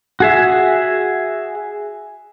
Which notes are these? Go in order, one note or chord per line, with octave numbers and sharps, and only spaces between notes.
F#4 G#4 E5